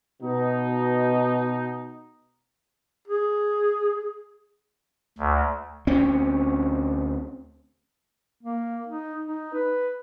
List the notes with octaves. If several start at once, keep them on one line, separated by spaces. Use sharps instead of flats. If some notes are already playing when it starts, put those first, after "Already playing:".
B2 D#4
G#4
D2
D2 C4 C#4
A#3
D#4
D#4
B4